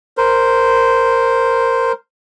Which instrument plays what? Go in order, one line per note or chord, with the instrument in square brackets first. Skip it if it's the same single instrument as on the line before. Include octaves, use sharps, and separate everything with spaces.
[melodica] A#4 C5